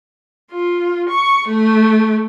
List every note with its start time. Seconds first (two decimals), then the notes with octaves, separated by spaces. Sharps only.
0.51 F4
1.09 C#6
1.47 A3